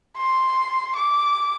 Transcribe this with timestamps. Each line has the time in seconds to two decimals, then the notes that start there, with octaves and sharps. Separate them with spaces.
0.17 C6
0.95 D6